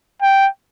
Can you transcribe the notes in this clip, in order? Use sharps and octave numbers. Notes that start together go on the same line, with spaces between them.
G5